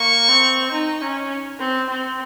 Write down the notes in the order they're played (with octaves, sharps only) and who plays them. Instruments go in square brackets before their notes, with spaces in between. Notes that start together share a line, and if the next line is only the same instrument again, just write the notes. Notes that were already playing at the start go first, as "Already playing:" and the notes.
Already playing: [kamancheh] A#3 [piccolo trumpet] C#6
[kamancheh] C4
D#4
C#4
C4
C4